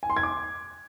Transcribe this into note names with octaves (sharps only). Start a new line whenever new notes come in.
G#5
C6
G#6
D6